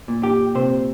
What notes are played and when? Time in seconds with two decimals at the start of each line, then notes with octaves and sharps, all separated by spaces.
0.08 A#2
0.23 G4
0.55 C3 C5